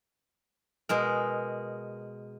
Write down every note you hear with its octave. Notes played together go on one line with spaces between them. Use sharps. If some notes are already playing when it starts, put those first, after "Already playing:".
B2 G#3 A#4